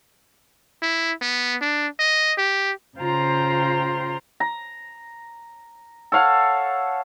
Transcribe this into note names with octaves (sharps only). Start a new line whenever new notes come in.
E4
B3
D4
D#5
G4
C#3 F4 C5 G5 A#5 C6
A#5
A4 C#5 F5 F#5